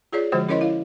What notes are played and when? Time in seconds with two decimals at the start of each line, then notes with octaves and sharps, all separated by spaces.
0.12 F4 G#4 C#5 D5
0.32 D3 F3 G#3 F#4 C5
0.49 C#4 E4 A#4 C#5 D#5 C6
0.61 E4 F5